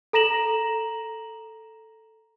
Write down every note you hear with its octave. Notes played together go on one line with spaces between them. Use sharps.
A4 A#5 A#6 E7 F#7